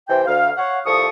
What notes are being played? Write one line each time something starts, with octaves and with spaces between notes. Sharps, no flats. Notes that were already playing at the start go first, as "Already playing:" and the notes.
C3 E3 C5 G5
D2 F5
C#5 F5 F#5
C2 F3 A4 C#6 D#6